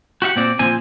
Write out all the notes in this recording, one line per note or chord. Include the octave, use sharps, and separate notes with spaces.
F#4 G4 E5 F#5
A#2 C4 D5
A#2 F3 C4 G#5